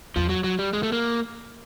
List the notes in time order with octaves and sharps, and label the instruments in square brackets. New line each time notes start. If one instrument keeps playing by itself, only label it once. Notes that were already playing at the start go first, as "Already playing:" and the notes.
[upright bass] E2 [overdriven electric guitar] F3
[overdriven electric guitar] F#3
F#3
G3
[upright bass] F2 [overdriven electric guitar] G#3
[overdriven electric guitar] A3
A#3